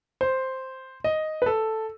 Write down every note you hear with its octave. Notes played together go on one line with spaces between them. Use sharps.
C5
D#5
B4
A4